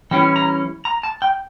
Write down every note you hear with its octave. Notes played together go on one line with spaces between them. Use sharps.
E3 G3 C#4 E4 G5
A#5
A#5
A5
G5